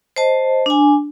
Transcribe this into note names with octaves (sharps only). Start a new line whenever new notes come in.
C5 D#5 A5
D4 G#5